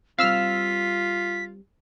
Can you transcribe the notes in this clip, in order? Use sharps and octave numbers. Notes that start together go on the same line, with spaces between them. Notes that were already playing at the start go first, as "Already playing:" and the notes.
G3 C4 F4 F5 E6 F6 B6